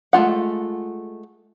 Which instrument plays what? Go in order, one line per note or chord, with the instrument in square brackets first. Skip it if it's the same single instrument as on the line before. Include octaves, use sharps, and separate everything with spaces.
[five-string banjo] G#3 A3 F4 F#5